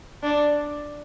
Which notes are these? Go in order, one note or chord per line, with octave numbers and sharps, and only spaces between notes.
D4